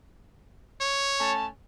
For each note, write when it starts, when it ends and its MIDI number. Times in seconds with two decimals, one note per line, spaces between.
0.81 1.33 73
1.20 1.47 57
1.20 1.47 61
1.20 1.47 81